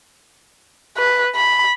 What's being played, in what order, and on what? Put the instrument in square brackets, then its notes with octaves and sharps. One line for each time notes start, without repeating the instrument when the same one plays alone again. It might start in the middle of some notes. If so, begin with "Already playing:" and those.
[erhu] B4
B5